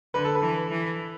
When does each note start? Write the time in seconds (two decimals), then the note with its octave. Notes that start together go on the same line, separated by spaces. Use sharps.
0.14 D3 B4
0.24 A4
0.35 B4
0.42 E3
0.71 E3